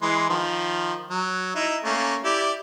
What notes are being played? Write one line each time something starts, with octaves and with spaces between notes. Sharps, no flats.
E3 G#3 C6
D#3 F3
F#3
D#4 E4
A3 A#3 C#4
E4 G4 D5